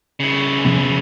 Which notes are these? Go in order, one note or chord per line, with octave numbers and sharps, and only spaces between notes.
C#3 E4
C3 F3 B3